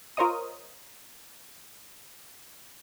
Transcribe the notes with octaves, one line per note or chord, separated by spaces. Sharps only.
F4 A#4 C5 C#5 D#5 D#6